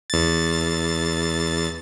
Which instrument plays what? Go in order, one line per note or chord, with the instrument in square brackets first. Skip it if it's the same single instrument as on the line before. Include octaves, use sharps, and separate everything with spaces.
[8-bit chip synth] E2 A6